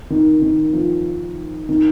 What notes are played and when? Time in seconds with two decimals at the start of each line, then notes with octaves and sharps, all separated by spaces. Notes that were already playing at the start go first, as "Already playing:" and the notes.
0.10 D#3
0.42 D#3
0.73 F3
1.69 D#3